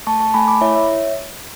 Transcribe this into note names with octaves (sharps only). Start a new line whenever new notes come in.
A3 A5 C#6
A5 C#6
A3 G#5 B5
B5 D6
E4 C#5 E5
C#5 E5